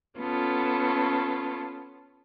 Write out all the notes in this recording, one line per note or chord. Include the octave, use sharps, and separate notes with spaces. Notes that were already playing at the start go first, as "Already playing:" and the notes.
B3 C#4 F4 A4